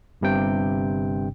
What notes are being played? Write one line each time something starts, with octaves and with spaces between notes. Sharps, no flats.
G1 G2 C3 G5